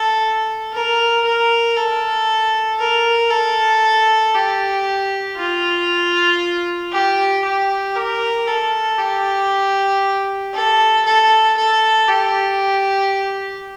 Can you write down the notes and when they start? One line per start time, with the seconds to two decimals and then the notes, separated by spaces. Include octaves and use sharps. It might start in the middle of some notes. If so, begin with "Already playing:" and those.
Already playing: A4
0.73 A#4
1.25 A#4
1.76 A4
2.79 A#4
3.31 A4
4.35 G4
5.37 F4
6.92 G4
7.45 G4
7.96 A#4
8.48 A4
8.99 G4
10.54 A4
11.05 A4
11.57 A4
12.08 G4